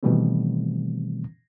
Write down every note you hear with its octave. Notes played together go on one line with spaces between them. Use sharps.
B2 D#3 E3 G3 A3 C4